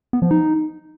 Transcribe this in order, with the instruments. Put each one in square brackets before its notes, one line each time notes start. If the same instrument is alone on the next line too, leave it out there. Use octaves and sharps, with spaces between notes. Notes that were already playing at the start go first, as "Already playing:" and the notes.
[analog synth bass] B3
F3
D#4